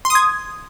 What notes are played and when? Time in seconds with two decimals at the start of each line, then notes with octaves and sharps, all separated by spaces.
0.05 C6
0.10 D#6
0.15 G#6